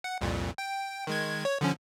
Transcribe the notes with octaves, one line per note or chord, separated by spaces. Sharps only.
F#5
C2 F2 A#2
G5
D#3 G#3 G#6
C#5
D3 F3 C#4